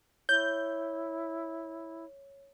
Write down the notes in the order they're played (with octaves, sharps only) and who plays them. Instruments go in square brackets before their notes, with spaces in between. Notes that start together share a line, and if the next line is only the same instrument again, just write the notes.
[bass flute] E4 [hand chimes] C#5 [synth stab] G6